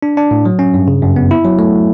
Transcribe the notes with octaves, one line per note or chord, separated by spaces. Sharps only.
D4
D4
A2
F#3
C#4
G2
C#3
F#2
B3
E4
F#3
A3